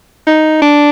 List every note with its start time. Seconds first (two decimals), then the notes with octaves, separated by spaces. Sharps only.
0.27 D#4
0.62 D4